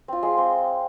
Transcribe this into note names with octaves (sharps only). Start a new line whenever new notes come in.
C4 F4
G#3
C4